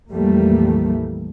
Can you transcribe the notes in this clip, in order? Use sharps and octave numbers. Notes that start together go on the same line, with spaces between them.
A#1 F2 E3 G3 A3 A#3